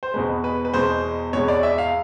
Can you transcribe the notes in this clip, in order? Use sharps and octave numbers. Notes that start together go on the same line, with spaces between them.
C5
E2 B2 G#3 B4
B4
B4
E2 B2 G#3 C5
E2 B2 G#3 C#5
D5
E5
F5